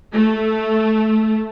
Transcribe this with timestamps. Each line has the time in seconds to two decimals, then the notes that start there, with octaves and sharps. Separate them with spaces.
0.12 A3